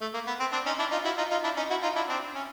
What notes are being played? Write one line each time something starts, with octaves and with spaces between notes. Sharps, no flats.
A3
A#3
B3
C4
C4 D4
C#4 D#4
D4 E4
D#4 F4
E4 F#4
D#4 F4
D#4 F4
D4 E4
C#4 D#4
E4 F#4
D#4 F4
D4 E4
C4 D4
C#4